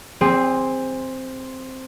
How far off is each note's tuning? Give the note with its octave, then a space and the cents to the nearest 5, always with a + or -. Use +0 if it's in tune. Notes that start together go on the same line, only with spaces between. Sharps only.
C4 +0 G#4 -30